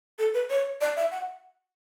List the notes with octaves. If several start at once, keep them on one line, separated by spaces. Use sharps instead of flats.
A4
B4
C#5
D5
E5
F#5